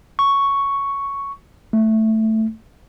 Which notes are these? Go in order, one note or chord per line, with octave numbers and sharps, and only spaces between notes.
C#6
A3